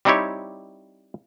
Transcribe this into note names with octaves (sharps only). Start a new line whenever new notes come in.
G3 C4 D#4 E4 G4 C#5